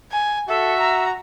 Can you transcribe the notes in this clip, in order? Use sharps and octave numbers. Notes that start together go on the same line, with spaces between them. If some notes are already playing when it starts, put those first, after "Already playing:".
G#5
F#4 A4 E5
A#5